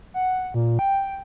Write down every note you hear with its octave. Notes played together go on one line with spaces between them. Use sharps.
F#5
A#2
G5